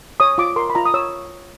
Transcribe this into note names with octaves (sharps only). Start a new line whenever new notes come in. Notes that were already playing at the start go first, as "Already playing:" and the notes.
C#5 D#6
F4 D6
A#4 C6
B5
F4 A#5
D#6
C#5 E6